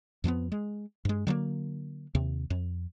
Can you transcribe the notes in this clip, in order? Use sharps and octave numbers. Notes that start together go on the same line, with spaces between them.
F2 F3 G3 B3
G#3
G2 G#3
D3 F#3 A3 A#3
D#2 C3
F2